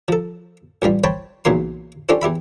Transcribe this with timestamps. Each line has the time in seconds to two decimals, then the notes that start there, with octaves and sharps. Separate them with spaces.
0.08 F3 A4
0.82 A1 G2 G3 F4
1.04 C5 C#5 G5 A5 B5
1.45 B1 E2 A#2 C#3 F#3 C6
2.09 C#4 D4 F4 G4 A4 C5
2.22 E2 G4 E5 B5